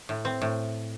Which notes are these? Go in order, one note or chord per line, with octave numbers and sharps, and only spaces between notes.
A2
C4
A2